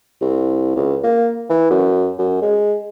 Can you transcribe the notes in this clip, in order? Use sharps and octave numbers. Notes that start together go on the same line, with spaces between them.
C2
C#2
A#3
E3
F#2
F#2
G#3